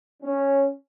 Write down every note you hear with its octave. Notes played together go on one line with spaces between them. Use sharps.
C#4